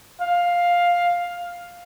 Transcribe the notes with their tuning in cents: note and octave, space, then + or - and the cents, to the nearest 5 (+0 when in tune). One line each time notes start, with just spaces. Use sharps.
F5 +5